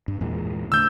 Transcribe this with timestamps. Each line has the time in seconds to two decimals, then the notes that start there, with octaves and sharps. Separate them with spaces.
0.08 G2
0.21 E2 A#2 G#3
0.72 D3 A3 E6 G6